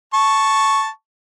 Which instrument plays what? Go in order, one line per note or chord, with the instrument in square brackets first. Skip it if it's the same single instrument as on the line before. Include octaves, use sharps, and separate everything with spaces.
[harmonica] A5 C#6